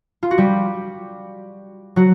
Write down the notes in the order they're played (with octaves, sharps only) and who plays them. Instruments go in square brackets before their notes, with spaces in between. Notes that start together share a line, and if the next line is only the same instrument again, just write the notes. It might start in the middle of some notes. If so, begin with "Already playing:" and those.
[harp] F4
F#4
G3 G4
F#3 F#4